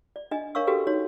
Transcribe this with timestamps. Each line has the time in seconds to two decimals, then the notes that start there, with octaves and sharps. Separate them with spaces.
0.16 D5
0.31 D4 D#5 G#5
0.55 D4 A#4 C#5 F5 C#6 E6
0.67 C#4 F#4 G4 A4 B4
0.87 D#4 F#4 C#5